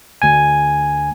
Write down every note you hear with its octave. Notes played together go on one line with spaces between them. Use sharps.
D2 G#5